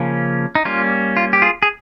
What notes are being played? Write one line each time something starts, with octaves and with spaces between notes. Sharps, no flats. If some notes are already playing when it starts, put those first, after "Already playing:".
Already playing: C#3 F3 A#3 C#4
D#4
G3 A#3 C#4 F4
F4
G4
F4 G#4
G#4